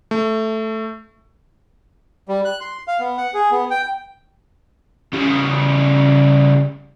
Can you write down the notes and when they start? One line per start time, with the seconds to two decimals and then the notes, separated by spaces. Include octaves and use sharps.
0.11 A3
2.29 G3
2.45 F#6
2.61 C6
2.88 F5
2.99 B3
3.17 F#5
3.34 G#4
3.51 B3
3.71 G5
5.13 C#3 G3